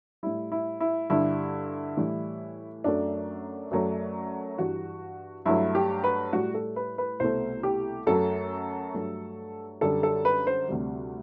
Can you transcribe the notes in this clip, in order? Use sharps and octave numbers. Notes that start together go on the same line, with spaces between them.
A2 G3 E4
E4
E4
G2 D3 G3 E4
A2 E3 G3
F#2 F#3 A3 D4
F#2 F#3 A3
G2 E3 G3 F#4
G2 F#3 A3 E4
G4
B4
A2 G3 F#4
A4
B4
B4
C2 B2 A3 C5
G4
F#2 F#3 A3 A4
G2 F#3 A3
F#2 D3 G3 A4
A4
B4
C5
D2 C3 G3